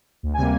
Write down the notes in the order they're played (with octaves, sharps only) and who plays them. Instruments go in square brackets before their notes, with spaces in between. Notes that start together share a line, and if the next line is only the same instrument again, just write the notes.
[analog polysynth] D2
G#5
C3 G3 A#3